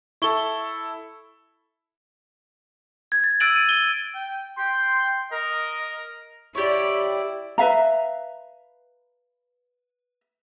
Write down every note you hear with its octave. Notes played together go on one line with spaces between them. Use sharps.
E4 A4 C#6 G7
G#6
A6
E6 F#6 A6 D7 D#7 F#7
D#7
G7
G5
G5 C6
A#4 D#5
E4 G4 C#5 D5
B4 E5 F5 A#5